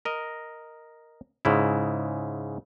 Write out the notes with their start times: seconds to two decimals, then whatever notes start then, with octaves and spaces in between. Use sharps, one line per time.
0.05 A#4 D#5
1.45 G#2 C#3 E4